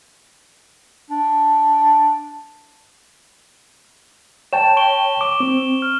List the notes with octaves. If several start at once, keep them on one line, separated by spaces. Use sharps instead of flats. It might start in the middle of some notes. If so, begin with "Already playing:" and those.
D4
C#5 G5 A5 E7
C#6 D7 G7
D6
C4
F6